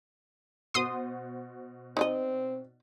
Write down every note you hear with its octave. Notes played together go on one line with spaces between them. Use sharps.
B2 F#4 C5 C6 D#6
C4 D#4 D5 D#5